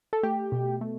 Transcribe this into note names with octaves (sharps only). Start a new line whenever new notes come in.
A4
A3 G4
B2
A3